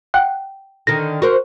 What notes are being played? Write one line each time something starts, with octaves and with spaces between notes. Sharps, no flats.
F#5 G5 F#6
D3 D#3 A#6
F#4 A#4 C5